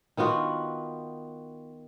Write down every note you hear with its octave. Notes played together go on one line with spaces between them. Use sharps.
D#3 B3 F4 F#4